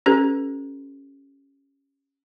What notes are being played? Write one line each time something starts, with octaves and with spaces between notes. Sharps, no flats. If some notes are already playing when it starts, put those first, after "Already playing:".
C#4 G4 A4 B4